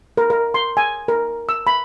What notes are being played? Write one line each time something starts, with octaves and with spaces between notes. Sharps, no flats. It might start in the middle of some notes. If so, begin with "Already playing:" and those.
A#4
A#4
C6
G#5
A#4
E6
B5